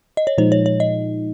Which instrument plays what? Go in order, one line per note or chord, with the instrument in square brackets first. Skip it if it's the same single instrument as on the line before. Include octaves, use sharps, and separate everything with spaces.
[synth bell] D#5
C#5
[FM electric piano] A#2 F3 G#3 D#4 [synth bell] C5
[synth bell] C#5
C#5
D#5